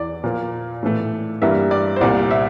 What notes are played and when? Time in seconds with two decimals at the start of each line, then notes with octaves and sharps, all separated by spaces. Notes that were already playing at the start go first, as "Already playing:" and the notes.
Already playing: E2 E3 D5
0.24 A#2 F3 A#3
0.83 A2 E3 A3
1.42 G2 E3 G3 A#3 E5
1.71 D5
1.96 C5
2.01 C2 A#2 G3 D5
2.31 E5